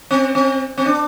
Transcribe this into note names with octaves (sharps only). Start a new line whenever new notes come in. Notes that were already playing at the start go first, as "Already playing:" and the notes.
C4
C4
C4
D4